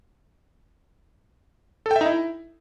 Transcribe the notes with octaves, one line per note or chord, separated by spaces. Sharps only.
A4
G5
E5
D#4
E4